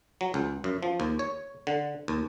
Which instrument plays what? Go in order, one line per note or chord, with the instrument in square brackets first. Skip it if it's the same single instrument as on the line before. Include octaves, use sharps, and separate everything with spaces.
[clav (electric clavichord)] F#3
C#2
F#2
F3
D#2
C#5
D3
D#2